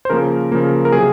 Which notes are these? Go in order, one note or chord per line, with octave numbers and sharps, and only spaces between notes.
C5
C#3 F3 A#3 A#4
C#3 F3 A#3
A#4
C3 F#3 A#3 G#4